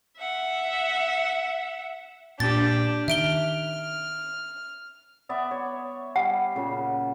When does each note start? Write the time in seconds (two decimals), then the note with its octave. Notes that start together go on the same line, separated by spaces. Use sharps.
0.18 E5 F#5
2.40 A#2 D4 G4 A6
3.08 D#3 E5 F6 D7 G7
5.29 B3 D5 E5
5.51 C#5
6.16 G3 F#5
6.56 A#2 C#3 F#4